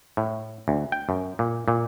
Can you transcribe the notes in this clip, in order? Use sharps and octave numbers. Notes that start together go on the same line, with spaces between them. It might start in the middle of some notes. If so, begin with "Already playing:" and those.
A2
D2
G5
F#2
A#2
A#2